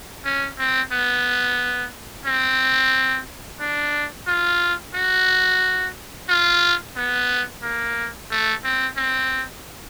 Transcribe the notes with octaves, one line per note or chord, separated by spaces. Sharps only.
C#4
C4
B3
C4
D4
F4
F#4
F4
B3
A#3
A3
C4
C4